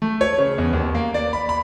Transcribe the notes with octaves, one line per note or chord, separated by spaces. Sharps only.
A3
C#5
C#3
E2
D#2
A#3
D5
B5
B5